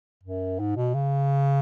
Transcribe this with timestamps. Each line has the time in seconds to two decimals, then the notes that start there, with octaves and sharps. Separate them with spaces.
0.23 F#2
0.59 G#2
0.76 B2
0.94 C#3